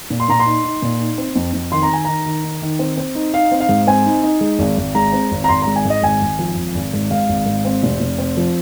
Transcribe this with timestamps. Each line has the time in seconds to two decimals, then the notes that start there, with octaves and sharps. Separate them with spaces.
0.10 A#2
0.20 C6
0.29 A#2 A#5
0.40 C6
0.46 D#4
0.64 D#4
0.82 A#2
1.00 D#4
1.18 C4
1.35 F2
1.53 F2
1.72 D#3 C6
1.83 A#5
1.90 D#3 G#5
2.05 D#3 A#5
2.26 D#3
2.44 D#4
2.62 D#3
2.79 C4
2.97 C4
3.15 D#4
3.34 D#4 F5
3.52 C4
3.60 F5
3.69 G#2
3.87 C4 G#5
4.06 D#4
4.23 D#4
4.41 G#3
4.59 G#1
4.78 G#1
4.95 G#3 A#5
5.13 C4
5.31 G#1
5.44 A#5
5.49 G#1 C6
5.62 A#5
5.67 G#3
5.76 G#5
5.85 G#2 D#5
6.03 G#1 G#5
6.21 G#1
6.39 F3
6.56 G#1
6.75 G#1
6.93 G#2
7.11 G#2 F5
7.29 G#1
7.46 G#2
7.65 C4
7.83 F1
8.00 F1
8.18 C4
8.37 F3